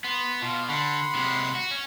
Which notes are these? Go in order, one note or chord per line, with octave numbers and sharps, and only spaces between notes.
B3 C6
B2 F4 F5
D3 F#5 B5 C6
C3 G#3
F#4
C#4